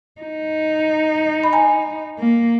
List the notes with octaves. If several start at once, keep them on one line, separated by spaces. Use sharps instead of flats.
D#4
B5
G#5 A#5
A#3